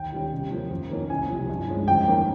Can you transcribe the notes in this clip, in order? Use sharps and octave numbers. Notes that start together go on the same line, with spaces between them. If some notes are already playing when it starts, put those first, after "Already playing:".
Already playing: D#2 G5
D#3 G3 C#4
C3
F3 A#3 C#4
F2
D#3 A#3 C#4
C2 G#5
C3 F3
G2
F3 G#3 C#4
F2 G5
D#3 A#3 C#4